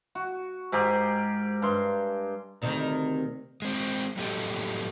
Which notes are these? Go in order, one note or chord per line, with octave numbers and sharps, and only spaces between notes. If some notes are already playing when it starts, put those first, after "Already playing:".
F#4
G#2 G4 G#4 A#4
G2 C6
D2 C3 D#3
G#3 C4
F2 A2 F#3 G4 A4 D#5